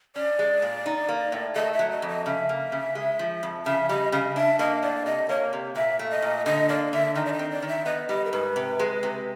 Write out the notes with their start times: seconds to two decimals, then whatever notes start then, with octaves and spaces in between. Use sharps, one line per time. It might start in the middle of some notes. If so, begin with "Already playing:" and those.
0.16 C#4 D5
0.39 G#3
0.62 A#2
0.86 D#4
1.09 A#3
1.32 A2
1.56 A3 D#5
1.73 E5
1.79 F#3
1.90 D#5
2.02 F2
2.08 D#5
2.26 C#3 E5
2.49 A#3
2.72 C#3
2.95 G#3
3.19 F3
3.43 F2
3.66 C#3 E5
3.89 G3 D#5
4.12 C#3 D#5
4.36 D4 E5
4.59 A#3 D#5
4.83 A2 D5
5.06 C3 D#5
5.29 A#3 C#5
5.53 C3
5.76 A#2 E5
5.99 A3
6.11 D#5
6.22 A#2
6.46 D3 D#5
6.69 A#3 D5
6.93 D3 E5
7.15 D#3 D#5
7.25 D5
7.33 D#5
7.39 C4
7.51 D5
7.62 D#3
7.68 E5
7.86 B3 D#5
8.09 G3 D#5
8.25 A#4
8.33 G#2 B4
8.56 C3
8.79 G#3
9.03 C3